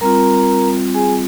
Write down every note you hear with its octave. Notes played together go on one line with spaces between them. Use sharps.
G3 C4 F4 A#4 A#5
G#4 G#5